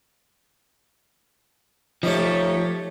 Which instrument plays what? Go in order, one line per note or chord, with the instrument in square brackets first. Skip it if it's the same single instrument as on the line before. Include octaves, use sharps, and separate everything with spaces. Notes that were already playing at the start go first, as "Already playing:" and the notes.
[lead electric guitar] F3 A3 [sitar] D#4 G4 C#5